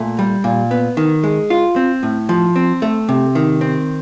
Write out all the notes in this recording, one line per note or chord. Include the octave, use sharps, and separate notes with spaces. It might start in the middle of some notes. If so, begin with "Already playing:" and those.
Already playing: A#2 A3
G3
A#2
B3
D#3
G#3
F4
C4
A2
F3
C4
A3
C3
D#3
C4